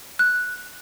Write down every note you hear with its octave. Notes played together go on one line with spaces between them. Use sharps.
F#6